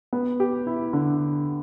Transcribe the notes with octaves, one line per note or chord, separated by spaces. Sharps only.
B3
G4
E4
D3